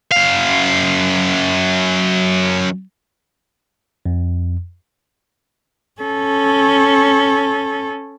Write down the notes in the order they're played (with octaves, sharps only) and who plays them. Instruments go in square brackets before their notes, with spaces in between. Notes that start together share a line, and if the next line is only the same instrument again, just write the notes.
[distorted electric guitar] F#2 F5
[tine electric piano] F2
[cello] C#4 A4